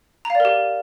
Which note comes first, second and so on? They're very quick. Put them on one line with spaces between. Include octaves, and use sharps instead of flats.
A#5 F5 D5 A#4 G4